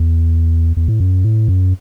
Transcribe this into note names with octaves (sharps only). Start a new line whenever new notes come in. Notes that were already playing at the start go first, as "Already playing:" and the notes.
Already playing: E2
E2
A2
F#2
A2
F#2